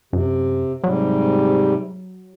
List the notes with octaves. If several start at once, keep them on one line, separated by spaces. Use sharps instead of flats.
F#2 C3
G#2 C3 F#3 G3